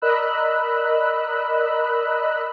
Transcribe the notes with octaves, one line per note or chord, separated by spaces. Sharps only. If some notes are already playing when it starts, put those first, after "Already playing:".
A#4 D5 D#5 B5 E6 F#6